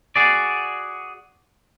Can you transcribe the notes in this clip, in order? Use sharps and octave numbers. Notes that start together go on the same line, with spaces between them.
F#4 G#4 D5